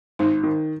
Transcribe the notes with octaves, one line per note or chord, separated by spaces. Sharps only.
G#1 D#4
D#3